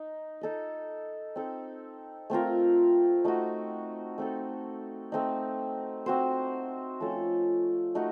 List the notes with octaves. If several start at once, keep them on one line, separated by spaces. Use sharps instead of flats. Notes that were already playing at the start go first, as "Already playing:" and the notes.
Already playing: D#4
D#4 A4 D#5
C4 D#4 A4
A3 C4 F4 A#4
A3 D#4 F#4
A3 C4 D#4 A4
A3 C4 D#4
C4 F#4 C5
F3 A3 C#4 A4
A3 D#4 F#4